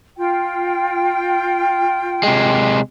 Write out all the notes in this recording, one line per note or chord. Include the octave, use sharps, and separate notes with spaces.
F4 G5
C3 G#3